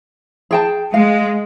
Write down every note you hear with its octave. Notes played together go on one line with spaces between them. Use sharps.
G#4 G5 A5
G#3 F5